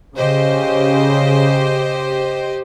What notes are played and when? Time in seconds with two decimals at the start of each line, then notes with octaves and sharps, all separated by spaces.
0.15 C#3 G4 C5 D#5